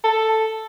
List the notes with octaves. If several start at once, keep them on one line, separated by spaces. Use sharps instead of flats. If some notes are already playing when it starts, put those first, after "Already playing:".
A4